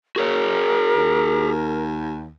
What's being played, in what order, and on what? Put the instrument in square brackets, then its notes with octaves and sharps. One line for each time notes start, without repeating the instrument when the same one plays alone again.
[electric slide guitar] F#4 G#4 C#5 [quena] A#4
[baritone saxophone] D#2